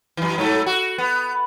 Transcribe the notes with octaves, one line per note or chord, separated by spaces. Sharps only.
F#2 E3
G#2 F#3 A3
F#4
B3